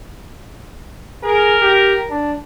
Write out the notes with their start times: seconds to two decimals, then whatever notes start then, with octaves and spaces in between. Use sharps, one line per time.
1.24 G#4 A#4
1.61 G4
2.10 D4